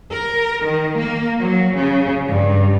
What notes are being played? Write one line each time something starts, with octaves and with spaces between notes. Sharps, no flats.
A#4
D#3
A#3
F#3
C#3
G2